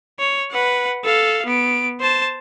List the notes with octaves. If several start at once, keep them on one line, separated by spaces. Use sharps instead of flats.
C#5
B4 F#5
A4 F5
B3 D7
C5 A5